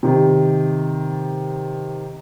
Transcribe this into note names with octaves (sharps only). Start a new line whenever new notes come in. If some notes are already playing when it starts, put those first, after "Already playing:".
C3 D#3